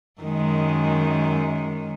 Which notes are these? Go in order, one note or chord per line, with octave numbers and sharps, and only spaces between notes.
F#2 D#3 G#3